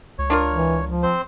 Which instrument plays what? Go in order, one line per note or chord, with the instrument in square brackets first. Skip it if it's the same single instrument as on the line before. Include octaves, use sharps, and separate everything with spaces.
[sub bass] C#2 [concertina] C#5
[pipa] D4 F4 A#4
[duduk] E3
F3
[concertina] C4 C5